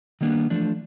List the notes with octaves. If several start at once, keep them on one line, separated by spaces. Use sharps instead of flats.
D#3 G3 A#3 B3 D4
E3 F3 A3 D4